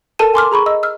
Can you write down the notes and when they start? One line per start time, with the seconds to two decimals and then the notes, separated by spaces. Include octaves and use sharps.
0.19 A4 A#4 A5 D#7
0.34 G#5 C6 D6 F6
0.52 G#4 A#5 B5 C#6
0.66 D#5 E6
0.83 E6 F6